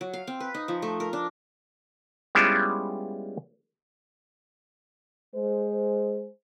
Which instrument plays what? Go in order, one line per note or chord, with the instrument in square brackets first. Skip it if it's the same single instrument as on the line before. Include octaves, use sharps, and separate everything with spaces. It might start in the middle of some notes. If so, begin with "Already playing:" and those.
[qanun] F#3
F5
C4
B4
D#4
F3
A3
A#4
D4
[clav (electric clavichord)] G3 G#3 B3 C#4 E4 F4
[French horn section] G#3 C5